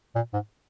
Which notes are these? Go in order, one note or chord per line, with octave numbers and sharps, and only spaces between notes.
A#2
G#2